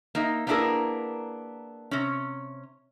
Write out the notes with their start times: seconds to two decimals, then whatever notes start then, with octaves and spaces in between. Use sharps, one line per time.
0.15 A#3 D#4 E5
0.47 A#3 B3 D4 E4 G#4 A#4
1.91 C3 C#4